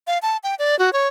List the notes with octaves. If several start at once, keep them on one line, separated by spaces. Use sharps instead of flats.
F5
A5
G5
D5
F#4
C#5